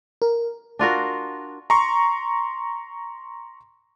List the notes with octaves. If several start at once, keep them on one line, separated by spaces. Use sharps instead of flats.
A#4
D4 F4 F#4 A#4
A#5 C6 C#6